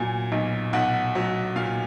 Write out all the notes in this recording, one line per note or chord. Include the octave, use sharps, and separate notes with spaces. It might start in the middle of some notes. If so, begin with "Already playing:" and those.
Already playing: A#2 F#3 G#5
B1
B1 F#5
F#3
A#2 F5